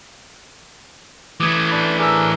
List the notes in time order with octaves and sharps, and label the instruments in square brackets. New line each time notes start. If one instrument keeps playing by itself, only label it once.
[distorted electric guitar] E3 A3 [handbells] D6 D#6 G#6
[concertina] D4 B5
[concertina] D4 G#4 A#4 [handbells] D6 E6